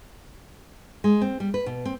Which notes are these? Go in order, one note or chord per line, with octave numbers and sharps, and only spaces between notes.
G#3
C4
G3
B4
B2
C4